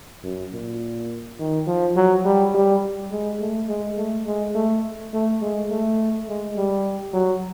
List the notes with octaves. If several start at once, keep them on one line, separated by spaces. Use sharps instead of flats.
F#2
A#2
D#3
F3
F#3
G3
G3
G#3
A3
G#3
A3
G#3
A3
A3
G#3
A3
G#3
G3
F#3